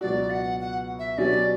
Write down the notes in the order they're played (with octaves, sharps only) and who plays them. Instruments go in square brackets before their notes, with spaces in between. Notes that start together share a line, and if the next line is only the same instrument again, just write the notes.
[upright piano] C#2 B2 F#3 B3 F#4 [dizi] D5
[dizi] F#5
F#5
E5
[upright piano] B2 F#3 C#4 G4 [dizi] D5